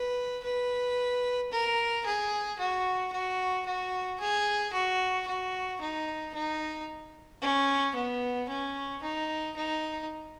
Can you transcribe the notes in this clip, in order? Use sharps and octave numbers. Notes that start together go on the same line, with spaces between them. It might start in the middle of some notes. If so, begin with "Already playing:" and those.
Already playing: B4
B4
A#4
G#4
F#4
F#4
F#4
G#4
F#4
F#4
D#4
D#4
C#4
B3
C#4
D#4
D#4